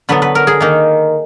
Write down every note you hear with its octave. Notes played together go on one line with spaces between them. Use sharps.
D3 F#3 B3 B4
B4
A#4
G#4
D#3 A#3 D#4